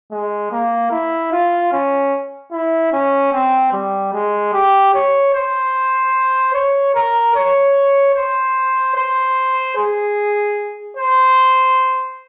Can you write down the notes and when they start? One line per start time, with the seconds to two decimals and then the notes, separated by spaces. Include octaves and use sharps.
0.12 G#3
0.51 A#3
0.91 E4
1.32 F4
1.72 C#4
2.52 E4
2.93 C#4
3.33 C4
3.73 G3
4.13 G#3
4.53 G4
4.94 C#5
5.34 C5
6.54 C#5
6.95 A#4
7.35 C#5
8.15 C5
8.96 C5
9.77 G#4
10.97 C5